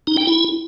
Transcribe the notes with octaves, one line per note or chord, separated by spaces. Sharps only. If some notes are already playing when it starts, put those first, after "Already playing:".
D#4
G5
E4